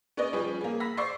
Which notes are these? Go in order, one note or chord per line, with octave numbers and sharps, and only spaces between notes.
C#4 B4 D5 D#5
F3 G3 C#4 G#4 B4
A#3 G#4
B5 E6 A#6 B6
C5 D5 C#6 D6 E6 C7